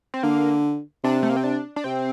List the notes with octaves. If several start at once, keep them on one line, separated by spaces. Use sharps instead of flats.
C4
D3 A#3
C3 D4
A3
A#3
C4
D4
D4
C3 C4